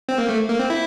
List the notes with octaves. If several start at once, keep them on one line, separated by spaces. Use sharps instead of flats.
C4
A#3
A3
A#3
C4
E4